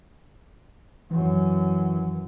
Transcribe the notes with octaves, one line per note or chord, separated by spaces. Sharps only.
F#2 E3